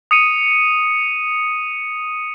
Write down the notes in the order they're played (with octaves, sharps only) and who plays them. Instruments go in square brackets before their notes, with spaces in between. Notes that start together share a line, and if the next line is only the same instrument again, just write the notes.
[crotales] D#6 C#7 D#7